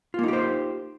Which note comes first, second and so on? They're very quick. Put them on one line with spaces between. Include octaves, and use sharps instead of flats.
F4 A#3 D#4 G4 C5